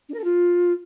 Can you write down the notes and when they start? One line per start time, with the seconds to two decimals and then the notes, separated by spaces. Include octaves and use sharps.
0.09 D4
0.14 A#4
0.19 A4
0.24 F4